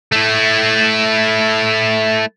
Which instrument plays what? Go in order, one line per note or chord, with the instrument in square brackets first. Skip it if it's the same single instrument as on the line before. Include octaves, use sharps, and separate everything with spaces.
[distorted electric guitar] A3 E4